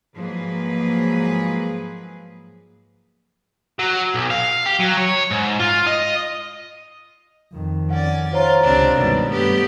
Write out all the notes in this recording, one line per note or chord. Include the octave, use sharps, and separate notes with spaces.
G#2 F3 F#3 A#3 G#4 B4
F#3
B1
F5
G4
F#3
C#5
G#2
F4
D#5
F2 D#3
C#4 D5 F#5
F4 C5 C#5 A#5
C#2 C3 C4 D4
G2 B2 D#3 G#3 D4
G2 A3 B3 G4